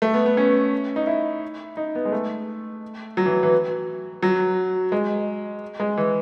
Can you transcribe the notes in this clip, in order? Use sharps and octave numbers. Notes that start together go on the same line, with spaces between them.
A3
B3
B3
C#4
D#4
E4
D#4
B3
G#3
A3
F#3
E3
E3
F#3
G#3
G#3
E3